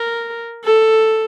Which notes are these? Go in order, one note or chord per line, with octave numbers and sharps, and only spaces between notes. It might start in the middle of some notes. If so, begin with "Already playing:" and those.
Already playing: A#4
A4